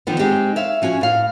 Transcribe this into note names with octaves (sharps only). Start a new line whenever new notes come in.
D3 D#3 F3 B3
G#3 C4 D#4 G4
C#5 E5 F5
F3 C#4 F#4 G#5
A2 F5